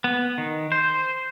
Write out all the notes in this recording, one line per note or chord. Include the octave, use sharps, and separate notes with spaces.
B3
D#3
C5